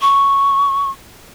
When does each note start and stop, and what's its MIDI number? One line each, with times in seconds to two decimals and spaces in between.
0.01 0.90 85